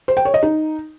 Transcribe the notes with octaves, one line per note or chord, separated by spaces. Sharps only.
C5
G5
C#5
D#5
D#4